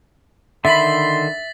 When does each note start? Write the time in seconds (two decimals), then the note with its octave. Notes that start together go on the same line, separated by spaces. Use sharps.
0.65 D3 D#3 E5 B5 C6 A6 B6 F#7